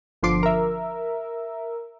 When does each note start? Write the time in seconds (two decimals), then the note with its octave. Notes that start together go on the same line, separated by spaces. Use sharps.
0.23 G1 D3 F3 C6 D6
0.43 A#4 E5